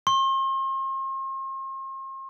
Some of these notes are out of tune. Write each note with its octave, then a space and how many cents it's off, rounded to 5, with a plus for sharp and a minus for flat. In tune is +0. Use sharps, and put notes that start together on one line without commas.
C6 +45